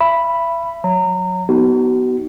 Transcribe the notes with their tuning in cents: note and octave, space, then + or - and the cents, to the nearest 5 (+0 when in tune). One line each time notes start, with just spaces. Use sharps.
E5 +35 B5 +0
F#3 -25 C#5 +5 A#5 -25
B3 +0 D#4 +0 F#4 +40